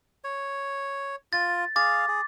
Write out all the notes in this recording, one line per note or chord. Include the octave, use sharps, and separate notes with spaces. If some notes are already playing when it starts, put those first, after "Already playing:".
C#5
F4 A6
G#4 F5 D6 A6
G#4